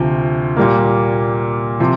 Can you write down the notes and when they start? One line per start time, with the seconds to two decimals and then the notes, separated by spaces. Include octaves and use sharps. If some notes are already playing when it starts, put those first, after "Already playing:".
Already playing: D2 C3 F3
0.57 A#2 G3 A#3
1.80 C3 F3